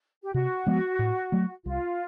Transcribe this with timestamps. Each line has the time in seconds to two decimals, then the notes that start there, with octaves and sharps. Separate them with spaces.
0.24 G4
0.34 C3 F#4
0.66 F3 G#3 B3
0.99 A2
1.32 F#3 A3
1.65 C2 F4